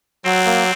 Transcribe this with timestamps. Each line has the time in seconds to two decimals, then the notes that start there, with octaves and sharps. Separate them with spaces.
0.25 F#3 C4
0.46 A#3